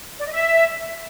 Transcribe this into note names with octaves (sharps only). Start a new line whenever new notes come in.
D5
D#5
E5